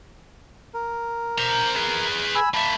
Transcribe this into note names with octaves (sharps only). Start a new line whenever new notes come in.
A#4
C5 A#5
G#4 B4
G#5 B5 E6
A#3 E5 A5 B5